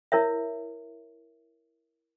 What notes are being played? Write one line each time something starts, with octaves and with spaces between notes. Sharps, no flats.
E4 A#4 C#5 E5